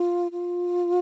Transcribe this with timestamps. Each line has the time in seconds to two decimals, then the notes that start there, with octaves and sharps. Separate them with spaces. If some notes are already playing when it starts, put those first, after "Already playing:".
Already playing: F4
0.32 F4